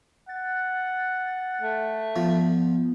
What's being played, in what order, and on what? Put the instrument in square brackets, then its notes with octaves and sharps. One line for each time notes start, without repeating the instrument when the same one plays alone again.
[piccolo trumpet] F#5 [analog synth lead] A6
[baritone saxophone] A3
[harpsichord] F3 [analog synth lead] B3